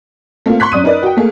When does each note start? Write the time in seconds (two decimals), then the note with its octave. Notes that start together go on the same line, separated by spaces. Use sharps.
0.46 A3 A#3 C4 F4
0.60 C6 C#6 F#6 B6
0.72 F#2 D5 D#6 D#7
0.84 D#4 A#4 B4 D5
1.03 F#4 G5
1.17 A3 A#3 G#4